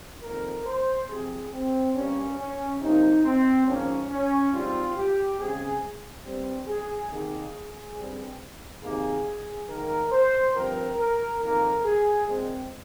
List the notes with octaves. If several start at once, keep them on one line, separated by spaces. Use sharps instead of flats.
F2 D#3 A#3 A#4
C5
C3 F3 C4 G#4
C4
G2 G3 A#3 C#4
C#4
C3 F3 A#3 D#4
C4
G#2 F3 A#3 C#4
C#4
G#2 G3 C4 F4
G4
C#3 G#3 C4 G#4
G2 G3 C4
G#4
C3 D#3 A#3 G#4
G2 G3 C4
C3 D#3 A#3 G#4
G#2 D#3 A#3 A#4
C5
G2 F3 C4 A#4
A#4
F2 D#3 A#3 A#4
G#4
A#2 G#3 C4